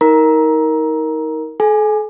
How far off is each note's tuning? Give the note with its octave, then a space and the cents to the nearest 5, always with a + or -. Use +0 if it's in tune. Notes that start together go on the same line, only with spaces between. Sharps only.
D#4 +30 A#4 +0 A#5 +15
A4 -45 G#5 +0